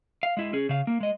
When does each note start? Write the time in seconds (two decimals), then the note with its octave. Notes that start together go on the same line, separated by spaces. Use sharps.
0.23 F5
0.37 G#3 E4
0.53 C#4 G#4
0.69 C#3 F5
0.87 A#3
1.00 G#3 D#5